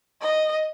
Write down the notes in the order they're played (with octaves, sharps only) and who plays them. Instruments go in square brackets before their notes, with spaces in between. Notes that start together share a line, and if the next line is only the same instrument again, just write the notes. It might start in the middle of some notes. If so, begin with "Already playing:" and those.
[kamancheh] D#5